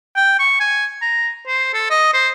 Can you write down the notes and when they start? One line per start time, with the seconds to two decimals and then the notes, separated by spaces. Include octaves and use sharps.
0.16 G5
0.39 C#6
0.60 G#5
1.02 A#5
1.47 C5
1.74 A4
1.90 D#5
2.14 C5